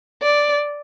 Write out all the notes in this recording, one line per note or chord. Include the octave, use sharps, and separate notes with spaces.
D5